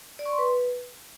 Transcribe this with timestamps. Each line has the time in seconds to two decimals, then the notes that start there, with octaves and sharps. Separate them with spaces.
0.19 D5
0.26 C#6
0.32 C6
0.38 B4